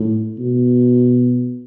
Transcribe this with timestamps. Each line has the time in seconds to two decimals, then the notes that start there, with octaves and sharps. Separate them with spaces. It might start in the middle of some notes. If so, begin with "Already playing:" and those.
Already playing: A2
0.39 B2